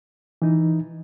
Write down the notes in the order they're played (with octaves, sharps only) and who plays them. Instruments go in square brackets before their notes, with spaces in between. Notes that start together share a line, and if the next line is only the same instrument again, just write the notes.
[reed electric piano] E3 D#4